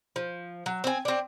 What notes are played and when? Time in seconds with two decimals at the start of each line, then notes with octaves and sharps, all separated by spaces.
0.16 F3
0.66 F#3
0.84 C4 G#5
1.05 C4 D4